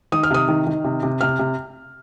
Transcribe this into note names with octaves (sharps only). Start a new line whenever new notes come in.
D#3 D#6
F6
C3 D#6
D#3
D#3
C3
C3
C3 F6
C3